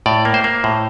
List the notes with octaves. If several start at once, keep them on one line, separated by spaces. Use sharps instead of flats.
A2 D5
A#3
C5
A#3
A2